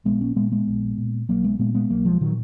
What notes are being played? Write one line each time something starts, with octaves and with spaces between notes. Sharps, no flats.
A#1 G#3 B3
A#3 C#4
A#2 G#3 B3
G#3 B3
A#1
A#2
B1 F#3 A#3
G#3 B3
A#2 G#3 B3
G#3 B3
B1 F#3 A#3
F3 G#3
A#2 D#3 F#3